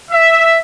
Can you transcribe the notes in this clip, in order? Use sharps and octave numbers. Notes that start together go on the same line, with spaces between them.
E5